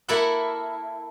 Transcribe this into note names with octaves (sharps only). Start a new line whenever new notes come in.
A#3 E4 A4 A#4 E5 F#5